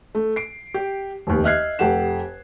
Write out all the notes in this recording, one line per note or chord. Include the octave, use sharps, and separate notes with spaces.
A3
C7 D7
G4
F1 D#2
D#5 E5 F6 F#6 G#6 C7
F1 G4 A4 F#5 E7